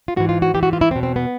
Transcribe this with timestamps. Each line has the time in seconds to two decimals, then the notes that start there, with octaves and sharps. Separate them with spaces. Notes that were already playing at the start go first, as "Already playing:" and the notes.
0.08 F4
0.16 G#2 E3 F#4
0.29 F4
0.42 F#4
0.54 G#2 E3 G4
0.63 F#4
0.73 F4
0.81 E4
0.91 E2 C4
0.96 B2
1.03 C4
1.16 B3